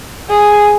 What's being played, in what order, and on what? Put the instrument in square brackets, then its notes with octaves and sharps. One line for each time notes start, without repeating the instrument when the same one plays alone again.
[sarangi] G#4